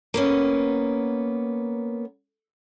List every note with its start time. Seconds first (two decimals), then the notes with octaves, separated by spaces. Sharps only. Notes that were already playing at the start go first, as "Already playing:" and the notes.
0.14 A#3 B3 C#4